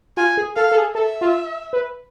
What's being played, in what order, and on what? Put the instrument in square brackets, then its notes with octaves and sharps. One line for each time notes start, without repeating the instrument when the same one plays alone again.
[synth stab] F4 [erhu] G#5
[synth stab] G#4
[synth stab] A4 [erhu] F5
[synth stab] A4
G#4
[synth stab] A4 [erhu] E5
[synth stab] F4
B4